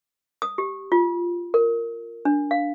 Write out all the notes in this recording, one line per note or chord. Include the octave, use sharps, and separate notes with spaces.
D#6
G4
F4
A#4
D4
F5